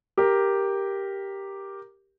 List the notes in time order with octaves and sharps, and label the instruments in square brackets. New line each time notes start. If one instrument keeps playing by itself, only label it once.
[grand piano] G4 A#4